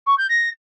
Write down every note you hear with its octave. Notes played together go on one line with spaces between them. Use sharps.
C#6
G6
A#6